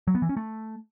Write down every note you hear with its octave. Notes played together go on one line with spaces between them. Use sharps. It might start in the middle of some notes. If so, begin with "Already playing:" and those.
F#3
B3
E3
C#4
A3